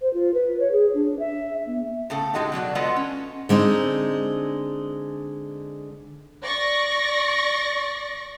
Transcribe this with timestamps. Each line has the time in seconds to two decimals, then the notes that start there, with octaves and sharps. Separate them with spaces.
0.01 C5
0.14 F4
0.34 B4
0.60 C#5
0.72 G#4
0.94 D4
1.19 E5
1.67 B3
2.10 A2 C#3 A4
2.34 A2 C#3 G#3 D#4 F#4 G4
2.52 B2 F#3 F#4 D5
2.75 G#3 B3 F4 A4 D#5 F#5
2.96 C#4
3.49 D3 G#3 C4 D#4
6.43 D5 C#6 A#6